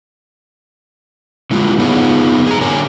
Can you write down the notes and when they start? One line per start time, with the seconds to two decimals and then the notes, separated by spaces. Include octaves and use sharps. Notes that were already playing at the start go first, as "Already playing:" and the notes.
1.51 D3 G#3 E4 F4 G4
1.78 F#2 B3 D#4 F4 G#4 C#5
2.46 G#4 A#5
2.61 D3 G4 A#4 C#5 G5 G#5